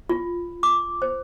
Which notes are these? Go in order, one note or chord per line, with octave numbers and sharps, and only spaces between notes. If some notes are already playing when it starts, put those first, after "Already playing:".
F4
D6
C5